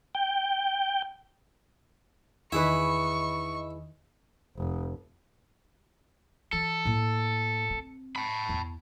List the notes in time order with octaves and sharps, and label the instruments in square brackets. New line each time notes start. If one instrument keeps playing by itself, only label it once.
[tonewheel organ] G5
[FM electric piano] E2 D#3 D#5 [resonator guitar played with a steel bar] E4 G#4 B4 [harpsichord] E5 [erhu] C#6
[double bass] F1
[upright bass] E3 [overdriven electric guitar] A4
[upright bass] A2 A#3
C4
[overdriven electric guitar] A5 B5
[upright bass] E2